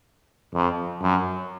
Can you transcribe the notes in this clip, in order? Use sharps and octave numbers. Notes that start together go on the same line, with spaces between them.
F2
F#2